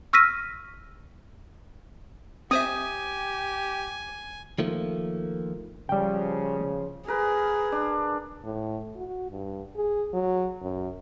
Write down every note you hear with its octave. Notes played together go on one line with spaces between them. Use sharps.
C#6 E6 F6 A#6 B6 D#7
C4 G4 C5 E5 G#5 D#6
D#3 F3 A3 A#3
C#3 F3 G3 G5
G#4 A#4 B4
D4
A2
F#4
G2
G#4
F#3
F#2